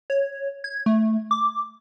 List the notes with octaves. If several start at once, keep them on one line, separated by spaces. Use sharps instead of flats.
C#5
G#6
A3
D6